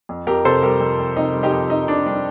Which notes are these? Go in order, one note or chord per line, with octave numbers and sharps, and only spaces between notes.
F2
F2 G4 A#4
C3 A4 C5
G3 G4 A#4
F2
F2
C3 D#4
G3
D#4 G4
F2
F2 D#4
C3 D4
G3 D4